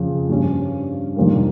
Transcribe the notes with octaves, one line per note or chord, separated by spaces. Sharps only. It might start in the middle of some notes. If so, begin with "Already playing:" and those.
Already playing: F2 C#3 F3
G2 G3 C#4
F2 C3 D#3 G3 A#3